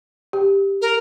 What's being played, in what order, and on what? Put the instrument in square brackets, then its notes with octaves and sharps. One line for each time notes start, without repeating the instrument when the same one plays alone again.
[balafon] G4
[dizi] A#4